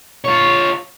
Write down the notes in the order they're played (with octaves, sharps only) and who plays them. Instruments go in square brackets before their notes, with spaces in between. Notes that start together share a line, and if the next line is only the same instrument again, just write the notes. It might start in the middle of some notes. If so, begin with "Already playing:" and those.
[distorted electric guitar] F4 C#5